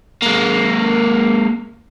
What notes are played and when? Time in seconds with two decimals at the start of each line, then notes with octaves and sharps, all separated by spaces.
0.22 G#3 A#3